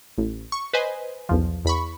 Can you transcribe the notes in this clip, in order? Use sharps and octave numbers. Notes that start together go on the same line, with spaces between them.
A1
C#6
B4 C5 D#5 G#5
B1 E2 F3
E2 B5 C#6